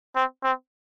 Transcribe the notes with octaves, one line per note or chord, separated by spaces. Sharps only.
C4
C4